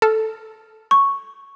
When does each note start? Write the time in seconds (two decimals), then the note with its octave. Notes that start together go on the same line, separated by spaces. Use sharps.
0.02 A4 F6
0.91 C#6